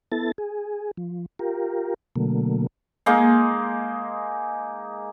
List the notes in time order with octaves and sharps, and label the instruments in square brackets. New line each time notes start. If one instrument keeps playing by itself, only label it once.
[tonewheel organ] B3 E4 A4 A6
G#4
F3
F4 G4 A#4
B2 D3 F#3 A3 A#3
[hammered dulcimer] G#3 A#3 D#4